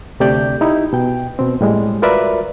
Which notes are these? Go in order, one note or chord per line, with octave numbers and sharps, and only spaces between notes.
D2 C3 A3 G4 D5 G6
D#4 E4 G4
B2 G5
B2 C4
A2 G3 G#3
F4 F#4 A#4 B4 D5 E5